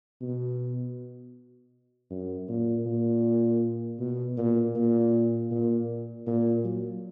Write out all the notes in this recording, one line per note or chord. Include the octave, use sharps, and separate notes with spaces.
B2
F#2
A#2
A#2
B2
A#2
A#2
A#2
A#2
F#3